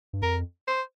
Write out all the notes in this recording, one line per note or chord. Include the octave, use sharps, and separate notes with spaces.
G2
F2 A#4
C5